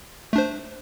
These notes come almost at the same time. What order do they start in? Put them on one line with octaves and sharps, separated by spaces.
A3 D4 C5